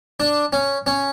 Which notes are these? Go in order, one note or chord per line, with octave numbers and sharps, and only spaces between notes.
D4
C#4
C#4